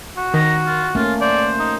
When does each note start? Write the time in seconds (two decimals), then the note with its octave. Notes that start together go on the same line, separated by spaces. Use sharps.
0.17 F#4
0.34 D#3 A#5
0.66 F4
0.95 A3 A#3 C#4 F4
1.21 C5 D5
1.59 D#4